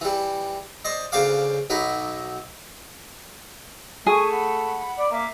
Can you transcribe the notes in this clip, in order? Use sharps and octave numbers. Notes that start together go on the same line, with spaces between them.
E3 G3
C5 D5 D#5
D2 C#3 C5 D5 F5 D6
B1 F#3 D#4 B5
A3 G#4 G#5 C#6
F#5 B5
D5
A#3 E5 F5 D6